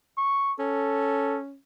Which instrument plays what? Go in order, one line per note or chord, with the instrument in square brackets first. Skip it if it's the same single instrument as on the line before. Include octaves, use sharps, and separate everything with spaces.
[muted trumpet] C#6
[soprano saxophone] C#4 [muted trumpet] A4